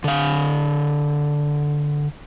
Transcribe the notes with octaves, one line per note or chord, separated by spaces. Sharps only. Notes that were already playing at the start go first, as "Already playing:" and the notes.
D3 F5